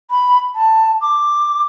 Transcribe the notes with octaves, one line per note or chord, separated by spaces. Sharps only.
B5
A5
D6